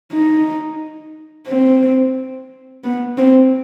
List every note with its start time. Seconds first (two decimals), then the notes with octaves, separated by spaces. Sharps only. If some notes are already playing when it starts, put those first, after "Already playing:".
0.13 D#4
1.48 C4
2.84 B3
3.18 C4